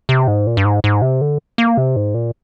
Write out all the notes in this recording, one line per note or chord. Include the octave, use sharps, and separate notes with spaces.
C3
G#2
A#2
G2
G#2
G#2
C3
D3
A#3
C3
G#2
A#2